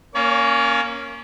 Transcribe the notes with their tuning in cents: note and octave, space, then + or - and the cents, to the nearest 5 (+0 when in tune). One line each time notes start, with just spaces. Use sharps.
A#3 +0 C#4 +0 C#5 +45